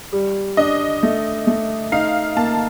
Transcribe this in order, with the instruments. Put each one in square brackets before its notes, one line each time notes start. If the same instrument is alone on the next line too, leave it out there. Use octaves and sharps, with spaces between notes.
[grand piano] G3
[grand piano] D4 [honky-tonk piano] D#5
[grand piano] A3
A3
[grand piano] D#4 [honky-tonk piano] F5
[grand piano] A#3 [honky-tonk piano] A5